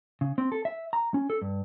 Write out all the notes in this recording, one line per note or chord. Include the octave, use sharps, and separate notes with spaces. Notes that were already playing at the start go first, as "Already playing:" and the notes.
C#3
C4
A4
E5
A#5
C#4
A4
G2